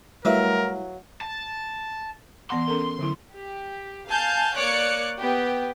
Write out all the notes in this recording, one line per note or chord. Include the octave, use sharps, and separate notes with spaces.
F#3 G3 A3 E4 A#4 B4 E5 F5
A5
E3 B3 F#5 C6
C#4 A4 A#4
D3 F#3 E4
G4
F5 G#5 A5 G6
A#3 C#5 D5 D6 F#6 C#7
B3 G4